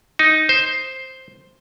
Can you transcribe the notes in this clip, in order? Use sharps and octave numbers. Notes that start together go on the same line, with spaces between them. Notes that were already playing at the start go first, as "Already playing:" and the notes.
D#4
C5